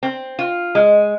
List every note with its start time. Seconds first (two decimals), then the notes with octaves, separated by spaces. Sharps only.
0.03 C4
0.39 F4
0.75 G#3